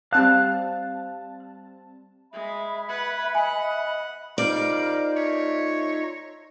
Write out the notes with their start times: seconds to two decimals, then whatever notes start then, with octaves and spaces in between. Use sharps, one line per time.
0.13 G3 C4 F5 A5 F#6
2.33 G#3 E5 B5
2.89 B4 F#5 G#6
3.35 D#5 F#5 G#5
4.38 G3 D#4 F4 A#4 C5 D5 D#5 F5
5.17 A3 C#5 E5